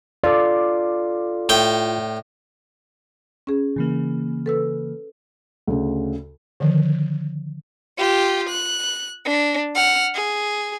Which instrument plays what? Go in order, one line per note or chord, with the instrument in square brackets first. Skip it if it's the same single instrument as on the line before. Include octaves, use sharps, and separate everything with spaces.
[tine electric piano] F4 A4 [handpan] D5
[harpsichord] A2 G5
[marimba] C#4 G#4
[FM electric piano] C#3 E3 A#3
[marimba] A4 B4 E6
[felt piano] D2 C#3
[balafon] D3 D#3 F3
[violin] F4 G4
F#6
D4
F#5 F6
G#4